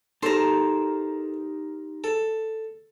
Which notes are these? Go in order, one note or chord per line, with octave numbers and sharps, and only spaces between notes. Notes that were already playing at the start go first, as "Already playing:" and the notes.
D#4 G4 A4 A#4 C5 A#5
A4